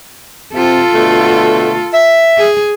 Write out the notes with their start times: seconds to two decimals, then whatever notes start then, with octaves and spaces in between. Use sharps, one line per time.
0.54 C3 F4 A4
0.94 B2 D3 A3
1.94 E5
2.38 G#4